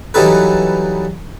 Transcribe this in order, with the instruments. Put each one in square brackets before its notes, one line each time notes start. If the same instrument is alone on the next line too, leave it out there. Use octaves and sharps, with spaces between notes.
[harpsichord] E3 F#3 G3 D#4 A4 B4